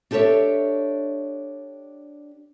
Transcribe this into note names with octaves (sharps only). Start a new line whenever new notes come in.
D4 G4 A4 B4 C#5 E5